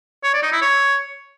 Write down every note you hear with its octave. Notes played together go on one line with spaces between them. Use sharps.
C#5
D5
D#4
E4
C#5